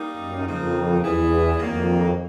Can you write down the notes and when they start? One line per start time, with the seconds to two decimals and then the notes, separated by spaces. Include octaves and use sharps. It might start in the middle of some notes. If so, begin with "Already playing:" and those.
Already playing: G3 A#3 D#4
0.17 F#2
0.45 F2 C#3 F3 A#3 D#4
1.02 E2 G3 B3 E4 G#4
1.58 F2 D#3 F#3 A#3